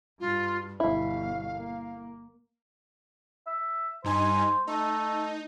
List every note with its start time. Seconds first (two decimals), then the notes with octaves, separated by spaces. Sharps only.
0.20 G2 F4
0.80 G1 B2 E4 F5
1.55 A#3
3.47 E5
4.04 G2 D#4 C5 G#5
4.67 A3 D#4